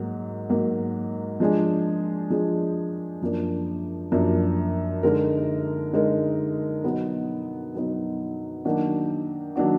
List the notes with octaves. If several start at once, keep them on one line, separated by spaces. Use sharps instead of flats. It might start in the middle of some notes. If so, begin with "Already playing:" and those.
Already playing: G#2 F#3 A#3
G#2 F#3 A#3
F3 G#3 D4 G#4
F3 G#3 D4 G#4
F#2 F3 A#3 D4
F#2 F3 A#3 D4
D3 G#3 D#4 A#4
D3 G#3 D#4 A#4
B2 F#3 B3 D#4
B2 F#3 B3 D#4
D#3 F#3 A#3 D4 F#4
D#3 F#3 A#3 D4 F#4